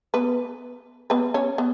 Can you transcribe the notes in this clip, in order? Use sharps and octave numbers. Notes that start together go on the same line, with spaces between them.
B3 B4
B3 B4
C#4 C#5
B3